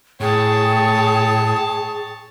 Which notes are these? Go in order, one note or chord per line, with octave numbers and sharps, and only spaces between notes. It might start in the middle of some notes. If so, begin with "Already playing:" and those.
A2 G#4 C#5 G5 A5